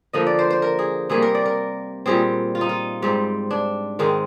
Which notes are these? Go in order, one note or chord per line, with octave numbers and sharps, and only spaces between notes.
D3 F3 A#3 D#5
D5
C5
C5
A#4
G#4
C3 G3 A#3 G#4
A#4
D5
A#4
A#2 G3 C4 G#4
F4
D#4
F4
G#2 G3 C4
D4
G#2 D#3 G#3 C4